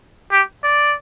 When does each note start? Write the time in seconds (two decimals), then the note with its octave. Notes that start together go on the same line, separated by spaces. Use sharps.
0.32 G4
0.64 D5